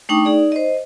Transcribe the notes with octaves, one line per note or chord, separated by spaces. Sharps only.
A3 D4 D#4 G5 C#6 D#6
D#4 G#4 D5
C5 D#5